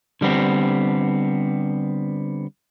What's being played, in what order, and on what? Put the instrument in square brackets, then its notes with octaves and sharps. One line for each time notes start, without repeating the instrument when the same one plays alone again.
[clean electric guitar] D3 G3 B3 C4